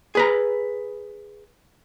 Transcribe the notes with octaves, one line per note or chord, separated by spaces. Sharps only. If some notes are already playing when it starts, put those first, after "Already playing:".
G#4 B4 A#5